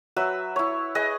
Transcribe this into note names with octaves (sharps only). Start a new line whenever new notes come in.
F#3 B4 E5 E6
E4 C#5
G#4 B4 D#5